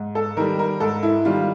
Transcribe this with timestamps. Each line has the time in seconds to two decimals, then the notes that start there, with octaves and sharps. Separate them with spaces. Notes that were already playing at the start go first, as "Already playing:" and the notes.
Already playing: G#2
0.15 A4
0.37 D#3 G3 A#4
0.59 A#4
0.80 G#2 A4
1.03 E4
1.25 D#3 G3 F4